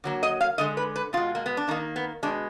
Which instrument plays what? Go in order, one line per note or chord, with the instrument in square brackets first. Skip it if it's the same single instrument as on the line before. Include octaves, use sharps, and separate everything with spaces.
[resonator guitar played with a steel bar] D3 F#3 A#3
D#5
F5
D3 G#3 D#5
B4
B4
B2 G#3 F4
A#3
B3
D4
D#3 A#3 D#4
B3
B2 G#3 D4